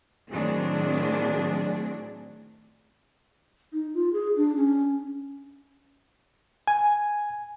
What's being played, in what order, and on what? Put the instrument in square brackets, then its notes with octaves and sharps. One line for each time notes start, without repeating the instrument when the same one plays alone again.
[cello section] A2 D#3 F#3 C4 D4 G#4
[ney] D#4
F4
G#4
D4
C#4
[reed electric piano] G#5